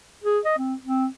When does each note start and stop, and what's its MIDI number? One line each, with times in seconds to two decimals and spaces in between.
0.24 0.39 68
0.45 0.55 75
0.58 0.75 60
0.85 1.06 60